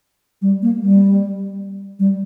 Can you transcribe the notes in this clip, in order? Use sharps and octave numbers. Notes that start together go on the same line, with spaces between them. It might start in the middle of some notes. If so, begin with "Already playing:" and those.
G3
A#3
G3
G3